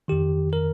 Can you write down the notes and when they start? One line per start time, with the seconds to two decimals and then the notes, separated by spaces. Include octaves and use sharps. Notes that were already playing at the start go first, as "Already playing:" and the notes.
0.08 F2 D#3 G4
0.53 A#4